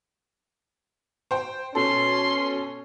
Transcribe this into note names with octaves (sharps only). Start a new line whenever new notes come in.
C5 G5
B2 C#4 A4 C6